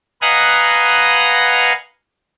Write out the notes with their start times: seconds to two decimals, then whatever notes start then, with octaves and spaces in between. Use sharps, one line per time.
0.22 B4 D#5 F5 F#5 G#5 A#5